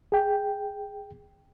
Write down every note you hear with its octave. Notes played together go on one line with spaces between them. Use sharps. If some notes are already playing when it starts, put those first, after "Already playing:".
G#4 G5